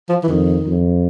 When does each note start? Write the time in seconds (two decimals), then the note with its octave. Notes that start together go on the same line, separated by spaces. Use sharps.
0.09 F3
0.23 E3
0.28 F2 D#3
0.67 F2